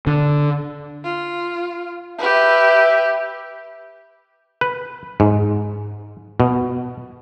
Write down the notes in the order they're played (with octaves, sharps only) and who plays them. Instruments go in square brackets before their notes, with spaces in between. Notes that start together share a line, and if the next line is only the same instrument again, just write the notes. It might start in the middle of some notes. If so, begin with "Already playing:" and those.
[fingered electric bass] D3
[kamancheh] F4
[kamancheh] G4 B4 [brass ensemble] E5
[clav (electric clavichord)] B4
G#2
B2